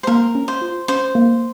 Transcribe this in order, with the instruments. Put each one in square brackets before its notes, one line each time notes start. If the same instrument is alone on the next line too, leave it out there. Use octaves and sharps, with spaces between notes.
[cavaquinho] C5
[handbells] A#3 [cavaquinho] A#4
[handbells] C#4
[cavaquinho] C5
[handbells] F4
[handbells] C#4 [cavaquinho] C5
[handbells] A#3